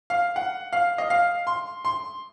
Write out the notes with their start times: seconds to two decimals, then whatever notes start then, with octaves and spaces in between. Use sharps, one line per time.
0.10 F5
0.36 F#5
0.73 F5
0.98 D#5
1.10 F5
1.47 C6
1.85 C6